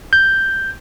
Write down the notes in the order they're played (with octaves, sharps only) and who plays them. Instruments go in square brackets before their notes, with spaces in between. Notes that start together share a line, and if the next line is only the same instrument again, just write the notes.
[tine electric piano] G6